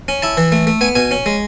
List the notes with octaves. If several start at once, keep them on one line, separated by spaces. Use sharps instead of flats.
C#4
E4 A5
E3
A3
A3
B3 G#5
B2 G#5
C#4
G#3